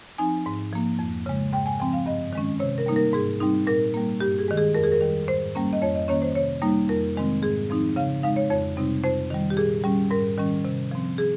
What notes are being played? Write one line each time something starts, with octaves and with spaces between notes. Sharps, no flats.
F3 C4 D#4 G#5
G#2
F3 A#3
F2
C#3 G#3
G#2 G5
G#5
F3 C4 G5
F5
G2 D#5
D#3 G#3 C#4
C3 C#5
A#4
G3 A#3 D#4
A#4
G#2 G#4
G3 C4 D#4
A#2 A#4
G3 A#3
G2 G4
G#4
D#3 G#3
G#4
F2 A#4
G#4
A#4
D#3 G3
G#2 C5
G3 A#3 C#4
D#5
F2 C#5
D#5
D#3 A#3 C#4 C#5
C5
C3 C#5
G3 A#3 D#4
F2 A#4
C3 D#3 G#3 C4
G#2 G#4
F3 C4 D#4
C#3 F5
G#3 D#4 F5
C#5
F2 C#5
C3 G3 C4 D#4
F2 C5
D#3 G3
G4
A#2 G#4
G3 C#4
G#2 A#4
D#3 G3 C#4
C3
F3 C4
G#4